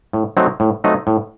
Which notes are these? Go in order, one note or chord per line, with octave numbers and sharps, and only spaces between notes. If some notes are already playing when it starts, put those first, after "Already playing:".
A2
F#3 A3 C4 D#4
A2
F#3 A3 C4 D#4
A2